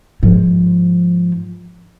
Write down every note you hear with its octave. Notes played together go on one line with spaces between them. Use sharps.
G#2 F3